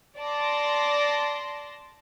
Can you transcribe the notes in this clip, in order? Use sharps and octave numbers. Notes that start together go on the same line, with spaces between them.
D5 A5 C6 A#6